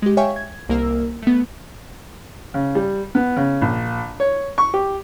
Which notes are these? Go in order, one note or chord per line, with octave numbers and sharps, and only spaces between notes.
G#3 G4
C#5 E5 F5 G5 G#5 C#6
G#6
C2 A#3 A#4 E6
A3 B3
C#3
G3
B3
C#3
A#1
C#5
C#6
G4